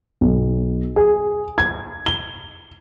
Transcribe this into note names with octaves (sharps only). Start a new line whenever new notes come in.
B1
G#4
G#6
G7